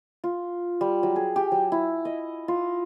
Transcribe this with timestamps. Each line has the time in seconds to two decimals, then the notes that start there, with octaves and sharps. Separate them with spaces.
0.24 F4
0.81 G3
1.03 F#3
1.16 G#4
1.36 G4
1.52 F#3
1.72 E4
2.05 D#5
2.48 F4